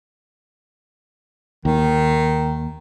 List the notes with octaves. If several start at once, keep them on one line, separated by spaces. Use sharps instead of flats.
D#2 D#3